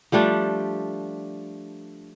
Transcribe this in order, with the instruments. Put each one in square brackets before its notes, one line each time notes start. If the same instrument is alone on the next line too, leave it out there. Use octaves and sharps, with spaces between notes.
[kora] F3 G3 A3 D4